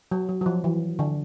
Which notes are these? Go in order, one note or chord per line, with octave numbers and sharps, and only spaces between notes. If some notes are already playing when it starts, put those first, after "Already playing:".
F#3
F#3
F#3
F3
E3
D3